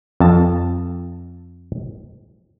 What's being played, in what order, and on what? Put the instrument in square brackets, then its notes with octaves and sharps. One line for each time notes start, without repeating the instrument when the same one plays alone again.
[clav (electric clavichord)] F2 A5